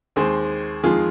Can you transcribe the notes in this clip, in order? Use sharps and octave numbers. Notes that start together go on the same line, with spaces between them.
D#2 D#3 G#3 C4 G#4 C5
F2 D#3 G#3 F4 G#4